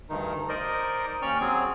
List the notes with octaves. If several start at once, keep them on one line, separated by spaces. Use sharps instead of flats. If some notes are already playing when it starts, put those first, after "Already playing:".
D2 G2 D#3 D#4
D#4 A#4 C5 D5 D#5
D#2 C#4 D5 G5 C#6 F6
F#3 C4 G#4